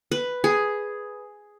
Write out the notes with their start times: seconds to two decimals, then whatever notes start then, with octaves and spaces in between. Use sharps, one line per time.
0.12 B4
0.44 G#4